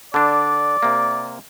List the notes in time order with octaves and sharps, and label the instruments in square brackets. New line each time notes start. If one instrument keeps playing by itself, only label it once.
[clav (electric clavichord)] D3 D4 [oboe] D5
[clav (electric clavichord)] C3 A#3